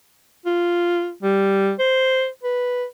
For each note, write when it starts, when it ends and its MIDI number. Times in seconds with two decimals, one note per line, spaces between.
0.46 1.12 65
1.23 1.72 55
1.79 2.28 72
2.43 2.85 71